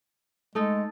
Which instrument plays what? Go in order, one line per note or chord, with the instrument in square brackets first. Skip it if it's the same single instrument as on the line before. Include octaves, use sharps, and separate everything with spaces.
[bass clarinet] G#3 [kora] A3 D#4 A4